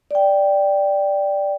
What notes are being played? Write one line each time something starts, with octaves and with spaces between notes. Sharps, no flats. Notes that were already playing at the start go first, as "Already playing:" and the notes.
D5 G5